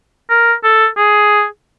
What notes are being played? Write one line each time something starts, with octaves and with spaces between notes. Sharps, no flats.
A#4
A4
G#4